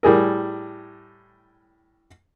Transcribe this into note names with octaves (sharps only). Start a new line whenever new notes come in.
A2 G3 G#4 A#4